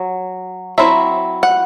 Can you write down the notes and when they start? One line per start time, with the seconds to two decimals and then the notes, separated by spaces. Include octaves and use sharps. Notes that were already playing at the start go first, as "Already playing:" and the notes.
Already playing: F#3
0.78 F#3 C4 E4 E5
1.43 F#5